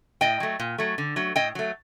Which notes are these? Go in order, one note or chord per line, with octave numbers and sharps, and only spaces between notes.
A2 D#5 G5
F#3 A3
A#2
F#3 A3
D3
F#3 A3
A2 D#5 G5
F#3 A3